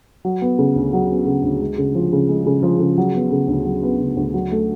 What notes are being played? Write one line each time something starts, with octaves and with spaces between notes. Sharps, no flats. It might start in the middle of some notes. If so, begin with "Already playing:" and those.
F#3
B3
C#3
D2
F#3
B3
C#3
D2
G#3
C#3
F3
C#3
G#3
C#3
F3
C#3
F#3
B3
C#3
D2
F#3
B3
C#3
D2
F#3
A3